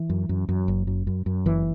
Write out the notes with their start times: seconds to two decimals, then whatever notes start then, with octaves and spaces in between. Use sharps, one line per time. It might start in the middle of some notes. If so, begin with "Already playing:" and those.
Already playing: E3
0.09 F#2
0.29 F#2
0.49 F#2
0.68 F#1
0.87 F#2
1.07 F#2
1.26 F#2
1.46 F#1 E3